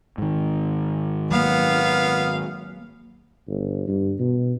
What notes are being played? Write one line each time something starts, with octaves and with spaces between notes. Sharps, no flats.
G#2 D#3
F#3 A#3 B3 F5
G1
G2
B2